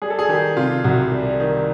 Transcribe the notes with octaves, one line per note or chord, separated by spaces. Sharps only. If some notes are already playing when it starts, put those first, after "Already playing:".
G3 G#4
A4
G#4
D#3 G4
C3 F4
C2 F#4
G3
D#3